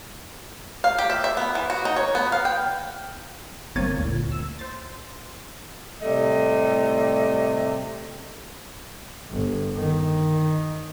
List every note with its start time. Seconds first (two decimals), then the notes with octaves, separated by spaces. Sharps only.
0.84 F5
0.98 G4
1.10 E5
1.24 E5
1.37 B3
1.55 E3
1.70 F#4
1.85 D#4
1.96 C#5
2.15 B3
2.32 F5
2.45 G5
3.75 G1 A#3 C4 C#5 A6 D#7
3.97 D2 A#2
4.32 E6
4.59 C5 A6
6.02 A2 C3 G3 A3 D#5
9.30 G1
9.75 D#3